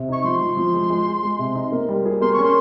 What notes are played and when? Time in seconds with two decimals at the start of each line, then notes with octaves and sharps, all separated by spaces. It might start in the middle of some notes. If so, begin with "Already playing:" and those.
Already playing: C3
0.08 D#4 C#6
0.24 F3 C6
0.41 F3
0.57 F3
0.74 G#3
0.90 G#3
1.07 G#3
1.23 G#3
1.39 C3
1.55 D#4
1.72 A#3
1.89 G3
2.05 G#4
2.21 A#3 C6
2.33 C#6
2.38 C#4
2.44 C6